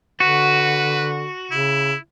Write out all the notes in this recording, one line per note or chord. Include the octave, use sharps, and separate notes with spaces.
D3 F#4 B4
C#3 E4